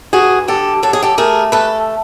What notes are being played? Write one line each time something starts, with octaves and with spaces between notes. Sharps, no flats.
G2 F#4 G#4
D3 G4 A4
F#3 A4
G#4
G4 A4
A3 G#4 A#4
A3 A4 B4